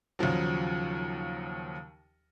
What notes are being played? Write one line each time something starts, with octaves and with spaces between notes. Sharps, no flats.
D#2 C#3 F3 F#3